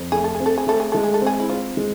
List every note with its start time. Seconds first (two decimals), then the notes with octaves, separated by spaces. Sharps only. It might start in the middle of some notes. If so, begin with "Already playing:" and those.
Already playing: F2
0.12 A3 G#4
0.24 A4
0.35 G#4
0.40 C4
0.46 A4
0.58 G#4
0.67 A3 A4
0.80 G#4
0.92 G#3 A4
1.04 G#4
1.14 A4
1.22 C4 G#4
1.40 E4
1.49 C4 F4
1.77 G#3